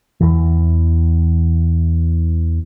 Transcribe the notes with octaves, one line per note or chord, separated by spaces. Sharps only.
E2 E3